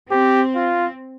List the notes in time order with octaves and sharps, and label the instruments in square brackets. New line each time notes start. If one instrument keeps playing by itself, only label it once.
[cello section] C4 [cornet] G4
[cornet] F4